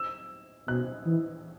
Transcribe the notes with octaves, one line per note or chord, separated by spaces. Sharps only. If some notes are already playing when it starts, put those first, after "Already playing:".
Already playing: E6
B2 F#6
E3